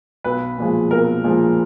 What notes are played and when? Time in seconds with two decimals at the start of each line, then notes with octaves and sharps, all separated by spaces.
0.24 B1 B4
0.58 A#2 F3 G#3
0.91 B1 A#4
1.24 A#2 F3 G#3